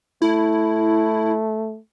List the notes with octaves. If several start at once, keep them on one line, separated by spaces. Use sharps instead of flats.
A3 E4